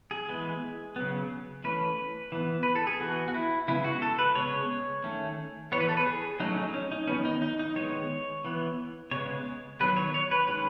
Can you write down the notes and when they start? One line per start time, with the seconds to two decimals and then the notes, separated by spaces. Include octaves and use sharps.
0.11 G#4
0.29 E3 G#3 B3
0.96 C#3 F#3 B3
1.64 E3 A3 C#4 B4
2.32 E3 B3
2.63 B4
2.75 A4
2.87 G#4
2.99 E3 B3 F#4
3.28 F#4
3.34 E4
3.68 C#3 G#3 B3 E4
3.84 F#4
4.02 A4
4.19 B4
4.35 C#3 G#3 B3 C#5
5.04 D#3 A3 C#4
5.72 E3 B3 C#5
5.80 B4
5.89 A4
5.97 B4
6.06 G#4
6.40 F#3 A3 C#4 D#4
6.57 D#4
6.74 C#4
6.92 D#4
7.07 D#3 G#3 B3 C#4
7.25 D#4
7.42 D#4
7.59 D#4
7.75 D#3 G#3 B3 C#5
8.45 E3 B3
9.11 C#3 G#3 B3 C#5
9.80 D#3 F#3 B3 B4
9.96 C#5
10.14 C#5
10.31 B4
10.47 D#3 G#3 C#4 B4